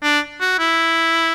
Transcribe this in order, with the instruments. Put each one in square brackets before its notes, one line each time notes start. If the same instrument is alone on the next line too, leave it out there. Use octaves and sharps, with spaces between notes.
[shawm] D4
F#4
E4